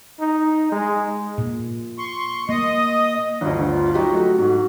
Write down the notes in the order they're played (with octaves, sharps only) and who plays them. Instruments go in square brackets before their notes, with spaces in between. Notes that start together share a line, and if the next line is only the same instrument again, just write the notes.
[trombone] D#4
G#3
[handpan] A#2
[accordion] C6 C#6
[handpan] A#3 [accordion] D#5
[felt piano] G1 D2 [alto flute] D4
[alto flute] F4
[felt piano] F#3 D#4 G4 [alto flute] F#4
[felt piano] A3
G#2